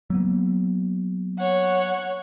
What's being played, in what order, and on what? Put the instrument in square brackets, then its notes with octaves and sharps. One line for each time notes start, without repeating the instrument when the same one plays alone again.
[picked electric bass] F#3 A#3 B3
[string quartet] C#5 F#5